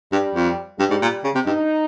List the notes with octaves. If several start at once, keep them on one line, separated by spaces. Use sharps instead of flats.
G2 G3
F2
G2 G3
G#2
A#2
C#3
C3
G2 D#4